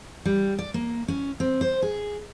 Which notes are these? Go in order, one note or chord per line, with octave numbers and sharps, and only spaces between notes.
G3
D5
A#3
C#4
C4
C5
G#4